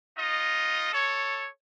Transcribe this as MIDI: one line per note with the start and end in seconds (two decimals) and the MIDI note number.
0.16 0.90 63
0.16 0.90 65
0.16 0.90 75
0.92 1.47 69
0.92 1.47 73